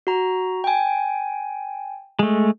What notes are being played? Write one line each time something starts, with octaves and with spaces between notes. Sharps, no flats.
F#4 A#5
G5 G#5
G#3 A3